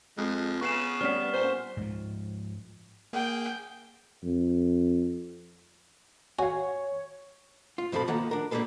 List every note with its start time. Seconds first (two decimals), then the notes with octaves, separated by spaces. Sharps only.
0.17 F2 G#3
0.61 C#3 B3 C#6 C7 E7
1.01 G3 C#4 F#5 F6 B6
1.34 A#2 C5
1.77 G#2 F3
3.13 A#3 G#4 G5
4.23 F2
6.39 F#4 C#5 F5 G#5
7.78 F4
7.92 G2 B2 F3 C4 A4 B5
8.08 D#3 F3 A#3 B3 F#5 A#5
8.31 D4 A#4
8.51 D3 G3 A#3 G#4 A4 B4